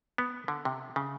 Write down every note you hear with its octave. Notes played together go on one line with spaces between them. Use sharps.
B3
D3
C3
C#3